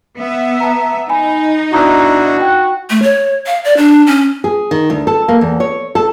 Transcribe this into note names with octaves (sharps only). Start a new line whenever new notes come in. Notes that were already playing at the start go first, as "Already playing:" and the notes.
B3 E5
A5 A#5
D#4 G#5 B5
B2 D4 E4 F#4 A#5 D#6
G5 F#6
A3
C#5
F5
D5
D4
C#4
G#4
D#3
D2
A4
A#3
E2
C#5
A4